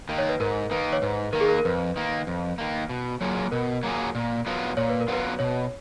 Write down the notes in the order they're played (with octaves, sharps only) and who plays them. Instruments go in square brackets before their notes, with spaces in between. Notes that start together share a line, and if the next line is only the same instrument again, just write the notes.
[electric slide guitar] D#3 A#3
[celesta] C#5
B4
[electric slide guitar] G#2 [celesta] A#4
[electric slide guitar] D#3 A#3 [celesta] B4
[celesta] C#5
[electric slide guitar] G#2 [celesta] B4
[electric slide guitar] D#3 A#3 [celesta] A#4
[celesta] G#4
A#4
A#4
[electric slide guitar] F2 [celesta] B4
[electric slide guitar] D#3 A#3
F2
D#3 A#3
B2
F#3 A#3 F4 G#4
[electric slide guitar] B2 [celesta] A#4
[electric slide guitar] F#3 A#3 F4 G#4
A#2
F#3 B3 F4
[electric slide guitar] A#2 [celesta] C#5
[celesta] B4
A#4
[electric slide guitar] F#3 B3 F4 [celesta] B4
[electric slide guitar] B2 [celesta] C#5